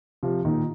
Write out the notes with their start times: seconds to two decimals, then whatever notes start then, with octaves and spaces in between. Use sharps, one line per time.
0.23 C3 F3
0.45 A#2 D#3